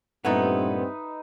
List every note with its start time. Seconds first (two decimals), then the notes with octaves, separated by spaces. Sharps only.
0.25 G2 A#2 A3 B3 C4 D#4 B4 E5